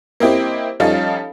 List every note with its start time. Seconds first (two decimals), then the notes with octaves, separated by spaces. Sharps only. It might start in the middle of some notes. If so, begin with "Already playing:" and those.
0.20 A#3 C4 E4 G4 D#5
0.80 F3 G3 C#4 D#4 A4 F5